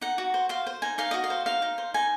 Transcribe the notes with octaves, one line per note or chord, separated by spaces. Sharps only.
D#4 F#5
F#4
C5
C5 F5
C5
D#4 G#5
D#4 F5
F#4 D#5
F5
C5
D#4 F5
D#4
C5
D#4 G#5